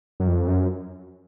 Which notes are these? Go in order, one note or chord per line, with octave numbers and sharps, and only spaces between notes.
F#2
F2
F#2